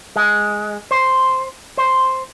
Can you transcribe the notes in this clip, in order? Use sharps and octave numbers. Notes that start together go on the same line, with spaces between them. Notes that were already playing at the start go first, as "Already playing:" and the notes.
G#3
C5
C5